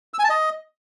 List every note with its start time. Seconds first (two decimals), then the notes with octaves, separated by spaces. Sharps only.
0.14 E6
0.19 G#5
0.24 A5
0.29 D#5